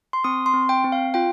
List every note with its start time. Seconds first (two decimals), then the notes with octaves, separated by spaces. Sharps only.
0.13 C6
0.24 C4 D#6
0.46 C6
0.54 C4
0.69 G5
0.84 C4
0.92 F5
1.14 F4 G5